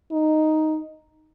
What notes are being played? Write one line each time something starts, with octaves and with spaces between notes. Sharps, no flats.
D#4